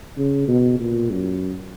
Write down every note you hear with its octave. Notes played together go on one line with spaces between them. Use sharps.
C#3
B2
A#2
F#2